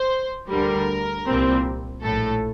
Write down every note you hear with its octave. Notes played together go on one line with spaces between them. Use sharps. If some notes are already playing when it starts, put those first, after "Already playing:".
Already playing: C5
D2 D3 G3 A#4
C2 A#2 G3 C4
A#1 A2 A3 A4